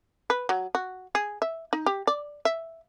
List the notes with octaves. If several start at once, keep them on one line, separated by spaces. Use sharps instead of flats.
B4
F#3
F#4
G#4
E5
D#4
G4
D5
E5